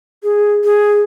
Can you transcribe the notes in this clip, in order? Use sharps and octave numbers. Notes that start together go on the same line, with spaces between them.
G#4
G#4